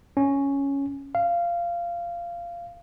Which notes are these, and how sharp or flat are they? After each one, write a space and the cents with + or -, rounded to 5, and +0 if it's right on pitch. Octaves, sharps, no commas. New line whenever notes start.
C#4 +0
F5 -15